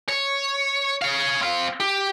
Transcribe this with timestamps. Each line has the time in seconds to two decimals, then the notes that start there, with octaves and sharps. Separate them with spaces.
0.09 C#5
1.02 C#5 F5
1.41 C4 F5
1.81 G4